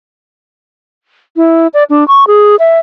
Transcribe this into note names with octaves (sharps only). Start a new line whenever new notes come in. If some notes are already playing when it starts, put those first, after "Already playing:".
E4
D5
D4
C#6
G#4
E5